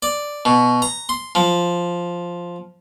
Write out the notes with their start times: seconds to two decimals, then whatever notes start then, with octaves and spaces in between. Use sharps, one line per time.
0.03 D5
0.45 B2
0.82 A#5
1.09 C6
1.35 F3